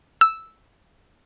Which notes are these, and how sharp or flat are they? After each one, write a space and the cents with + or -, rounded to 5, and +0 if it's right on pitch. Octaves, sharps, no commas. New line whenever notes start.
E6 -5